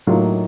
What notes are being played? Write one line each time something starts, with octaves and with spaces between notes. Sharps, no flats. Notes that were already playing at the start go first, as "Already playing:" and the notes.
A2 F#3 A#3 D#4 F4